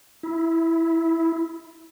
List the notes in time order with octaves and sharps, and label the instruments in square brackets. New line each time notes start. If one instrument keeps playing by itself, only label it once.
[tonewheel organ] E4